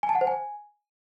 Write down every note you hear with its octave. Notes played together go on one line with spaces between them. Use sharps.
G#5
A5
F#5
C5
G#5